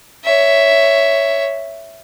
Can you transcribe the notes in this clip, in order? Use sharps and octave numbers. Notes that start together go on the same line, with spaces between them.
C#5 E5